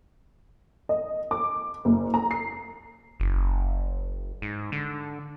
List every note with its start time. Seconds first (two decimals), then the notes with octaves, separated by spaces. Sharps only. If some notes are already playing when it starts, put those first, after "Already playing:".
0.89 D#5
1.31 D6
1.85 F#1
2.14 A#5
2.31 C7
3.20 F#1
4.42 G#2
4.72 D3